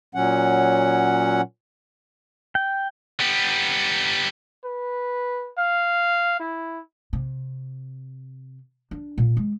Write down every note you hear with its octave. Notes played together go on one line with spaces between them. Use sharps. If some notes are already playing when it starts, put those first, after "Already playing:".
A#2 F#3 C#4 F#5
G5
G3 B3
B4
F5
E4
C3
D4
A#2
G#3